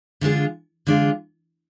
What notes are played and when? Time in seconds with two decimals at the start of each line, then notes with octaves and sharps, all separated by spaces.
0.21 D3 G#3 D4 F4 G#4
0.87 D3 G#3 D4 F4 G#4